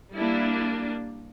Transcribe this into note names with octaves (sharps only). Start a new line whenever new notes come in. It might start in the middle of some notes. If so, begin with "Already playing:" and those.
G3 A#3 D4 E4